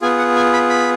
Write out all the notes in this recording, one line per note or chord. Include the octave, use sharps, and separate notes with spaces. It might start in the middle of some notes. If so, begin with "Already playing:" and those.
B3 F4 G#4 G#5
F#5
G#5
B5
B5